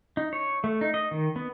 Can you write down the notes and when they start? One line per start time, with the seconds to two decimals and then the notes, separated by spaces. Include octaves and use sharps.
0.17 D#4
0.33 C#5
0.64 A3
0.81 D#4
0.94 D#5
1.11 D#3
1.36 B3